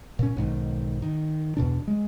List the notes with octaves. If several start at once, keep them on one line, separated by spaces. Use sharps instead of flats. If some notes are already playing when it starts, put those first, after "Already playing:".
A#2 C#4
B1 G#2 D#3
D#3
E2 B2 D4
G#3